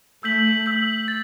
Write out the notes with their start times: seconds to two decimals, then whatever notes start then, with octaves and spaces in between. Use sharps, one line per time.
0.23 A3 E6 G6 B6 F#7
0.66 E6 G6 B6 F#7
1.08 A6